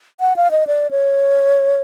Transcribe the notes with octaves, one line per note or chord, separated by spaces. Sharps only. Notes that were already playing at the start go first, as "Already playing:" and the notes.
F#5
F5
D#5
D5
C#5